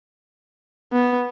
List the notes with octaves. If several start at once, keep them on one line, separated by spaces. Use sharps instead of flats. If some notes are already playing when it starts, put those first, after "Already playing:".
B3